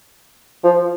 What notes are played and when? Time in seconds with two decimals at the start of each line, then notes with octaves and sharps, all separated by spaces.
0.64 F3